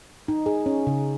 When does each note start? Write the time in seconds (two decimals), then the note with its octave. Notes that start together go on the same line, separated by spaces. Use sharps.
0.28 D#4
0.46 G#4
0.66 C#4
0.87 C#3